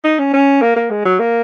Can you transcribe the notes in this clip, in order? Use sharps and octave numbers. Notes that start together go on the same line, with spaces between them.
D#4
C#4
C#4
A#3
A#3
G#3
F#3
A#3